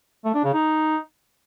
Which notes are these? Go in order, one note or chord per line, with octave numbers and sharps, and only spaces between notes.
A3
D4
C#3
D#4